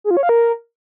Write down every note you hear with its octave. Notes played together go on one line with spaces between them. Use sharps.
G#4
F4
C#5
F5
A#4